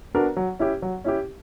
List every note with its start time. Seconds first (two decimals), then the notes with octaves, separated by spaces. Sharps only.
0.15 B3 D4 F#4 A#4
0.37 F#3
0.59 C#4 E4 G4
0.82 F#3
1.04 C#4 E4 G4